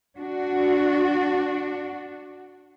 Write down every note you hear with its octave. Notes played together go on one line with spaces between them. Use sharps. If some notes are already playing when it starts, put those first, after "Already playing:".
D4 F#4